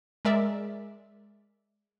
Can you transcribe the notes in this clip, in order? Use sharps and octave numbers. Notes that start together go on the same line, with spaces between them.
G#3 A#4 D5 E5